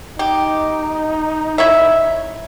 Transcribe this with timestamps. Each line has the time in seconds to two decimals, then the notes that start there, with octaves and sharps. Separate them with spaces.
0.19 D#4 G4
1.58 E4 C#5 E5